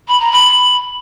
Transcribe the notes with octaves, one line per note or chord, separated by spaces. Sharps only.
B5
A#5
B5